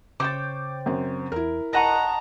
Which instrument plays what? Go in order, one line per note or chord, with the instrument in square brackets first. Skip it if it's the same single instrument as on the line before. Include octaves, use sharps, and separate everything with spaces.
[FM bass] C#3 [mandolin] C5 C#5 G5 [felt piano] D6 A6
[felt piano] F#2 C4
[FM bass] E2 [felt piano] E4 A#4
[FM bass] D#1 [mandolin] D#5 F#5 C#6 [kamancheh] A5 A#5